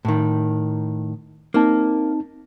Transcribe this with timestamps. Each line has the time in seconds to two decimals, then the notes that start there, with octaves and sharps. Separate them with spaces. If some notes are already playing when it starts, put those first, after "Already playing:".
0.05 A2 D#3
1.54 A#3 C4 D#4 A5